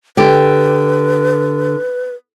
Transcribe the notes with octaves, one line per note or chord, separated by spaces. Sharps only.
D3 G4 B4